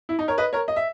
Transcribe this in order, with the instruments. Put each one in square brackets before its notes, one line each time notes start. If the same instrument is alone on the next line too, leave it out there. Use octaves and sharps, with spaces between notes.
[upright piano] E4
D#4
A#4 C#5
B4 D#5
A#4 C#5
D#5
E5